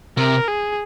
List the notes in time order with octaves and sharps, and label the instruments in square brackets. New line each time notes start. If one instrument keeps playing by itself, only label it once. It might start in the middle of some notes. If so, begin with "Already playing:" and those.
[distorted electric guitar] C3 [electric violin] A#4
[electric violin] G#4